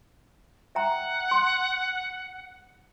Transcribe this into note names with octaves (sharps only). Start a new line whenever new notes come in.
E5 F#5 G5 A#5
C6